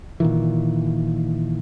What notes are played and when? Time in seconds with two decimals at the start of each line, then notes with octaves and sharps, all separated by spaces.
0.20 A#2 D#3 E3